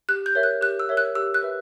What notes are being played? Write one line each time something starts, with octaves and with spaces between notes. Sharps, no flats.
G4 F#6
G6
A#4 C#5 E5
F#6
G4 F#6
E6
A#4 C#5 E5
F#6
G4 E6
F#6
B4 E5